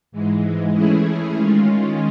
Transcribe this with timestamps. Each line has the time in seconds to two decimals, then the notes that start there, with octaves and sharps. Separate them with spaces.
0.12 G#2 E3 G#3
0.74 E3 A3 C#4 E4 G#4
1.35 D#3 G#3 C#4 F4